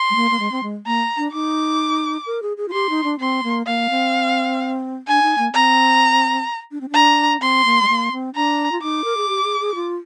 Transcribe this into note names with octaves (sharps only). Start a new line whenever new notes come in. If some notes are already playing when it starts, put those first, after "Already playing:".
Already playing: C6
G#3
A#3
A#3
G#3
C4
G#3
A#3 A#5
D4
D#4 D6
A#4
G#4
G#4
F4
G4 C6
D#4
D4
C4 C6
A#3
A#3 F5
C4
D4 G#5
D#4
A#3
C4 A#5
D4
C4
D4 A#5
C4 C6
A#3
G#3
A#3
C4
D4 A#5
F4
D#4 D6
A#4
G#4
G4
G#4
G#4
F4